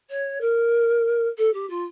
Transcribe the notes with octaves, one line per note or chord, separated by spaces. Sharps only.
C#5
A#4
A4
G4
F4